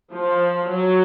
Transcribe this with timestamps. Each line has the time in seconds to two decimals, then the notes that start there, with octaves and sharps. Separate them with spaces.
0.13 F3
0.69 F#3